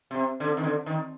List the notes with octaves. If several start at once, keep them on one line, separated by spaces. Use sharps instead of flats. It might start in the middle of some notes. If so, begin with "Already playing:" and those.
C3
D3
D#3
D3
D#3